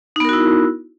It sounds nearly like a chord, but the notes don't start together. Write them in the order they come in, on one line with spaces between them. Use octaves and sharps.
D#4 B3 A#4 F#4 E4